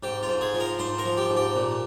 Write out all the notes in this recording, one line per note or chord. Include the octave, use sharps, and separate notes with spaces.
G#2 G4
F4
G#2
G#4
F3
A#4
G#2 C5
A#4
F3
G4
G#2
G4
A#2